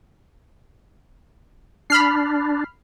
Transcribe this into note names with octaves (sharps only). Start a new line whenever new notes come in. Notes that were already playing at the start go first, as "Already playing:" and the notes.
D4 B5 F6 C7